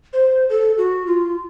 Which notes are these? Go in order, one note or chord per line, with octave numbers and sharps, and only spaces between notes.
C5
A4
F#4
F4